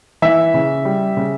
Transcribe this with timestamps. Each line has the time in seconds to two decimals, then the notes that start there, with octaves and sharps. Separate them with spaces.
0.22 E3 E5
0.54 C#3
0.85 G3
1.17 C#3